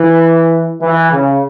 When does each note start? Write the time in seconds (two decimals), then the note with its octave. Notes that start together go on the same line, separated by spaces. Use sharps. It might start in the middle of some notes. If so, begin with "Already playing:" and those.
Already playing: E3
0.81 E3
1.11 C#3